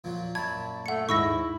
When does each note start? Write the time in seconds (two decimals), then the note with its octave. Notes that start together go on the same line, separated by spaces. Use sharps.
0.04 A#2 F3 F#3
0.35 F#2 A#2 C#5 A5 B5 G#6
0.86 A3 F#5 C#7
1.09 D#2 G#2 D#4 E4 C#6 E6 A#6